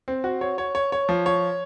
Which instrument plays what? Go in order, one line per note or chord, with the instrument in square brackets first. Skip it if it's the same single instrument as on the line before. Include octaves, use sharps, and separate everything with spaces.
[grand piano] C4
F#4
C#5
C#5
C#5
C#5
F3
C#5